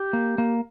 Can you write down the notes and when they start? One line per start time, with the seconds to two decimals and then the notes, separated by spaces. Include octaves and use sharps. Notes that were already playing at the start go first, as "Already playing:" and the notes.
Already playing: G4
0.13 A#3
0.38 A#3